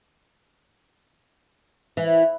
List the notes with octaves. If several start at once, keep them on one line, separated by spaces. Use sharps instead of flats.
E3